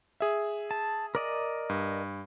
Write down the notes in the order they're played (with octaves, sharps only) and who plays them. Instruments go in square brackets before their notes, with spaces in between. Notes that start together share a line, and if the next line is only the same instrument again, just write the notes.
[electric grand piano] G#4 E5
[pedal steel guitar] A5
A#4 D5 D#5
[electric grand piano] G2